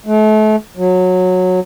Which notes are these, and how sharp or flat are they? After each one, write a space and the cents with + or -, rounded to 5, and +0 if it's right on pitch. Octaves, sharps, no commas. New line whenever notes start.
A3 -35
F#3 -15